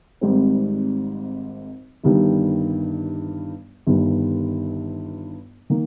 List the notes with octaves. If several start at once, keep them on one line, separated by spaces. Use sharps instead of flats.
G#1 G#2 G3 C4 D#4
G1 G2 D#3 G3
G1 G2 D#3
D#3 A#3